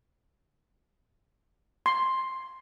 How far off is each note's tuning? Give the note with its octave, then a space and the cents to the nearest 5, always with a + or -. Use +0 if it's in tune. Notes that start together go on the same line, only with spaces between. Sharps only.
C6 +10